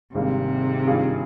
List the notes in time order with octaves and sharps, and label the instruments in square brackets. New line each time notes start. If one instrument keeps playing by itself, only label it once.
[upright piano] G#1 G#2 G3 A#3 D4 [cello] C3
[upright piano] G2 D#3 A#3 F4 G#4